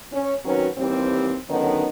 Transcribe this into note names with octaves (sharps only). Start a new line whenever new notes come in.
C#4
D#3 F#3 C4 C#4 F#4 B4
D#2 E3 G3 C4
D3 D#3 F#3 B3 C#4 D#4